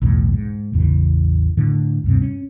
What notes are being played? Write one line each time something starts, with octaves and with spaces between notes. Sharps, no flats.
B1 E2 A2
G#2
A1 E2 C#3 E3
A2 D3
D2 G2 C3
C#4